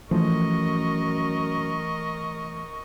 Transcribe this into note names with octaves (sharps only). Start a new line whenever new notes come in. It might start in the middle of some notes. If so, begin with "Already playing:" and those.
F#2 E3 F3 A3 A#4 D#5 C#6